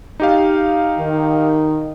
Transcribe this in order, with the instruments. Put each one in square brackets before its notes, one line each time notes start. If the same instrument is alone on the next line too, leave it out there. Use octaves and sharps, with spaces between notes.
[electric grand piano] D#4 G4 F5
[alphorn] D#3